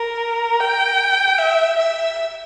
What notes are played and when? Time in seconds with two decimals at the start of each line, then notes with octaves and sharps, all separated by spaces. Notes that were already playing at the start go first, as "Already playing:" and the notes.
Already playing: A#4
0.60 G5
1.38 E5
1.78 E5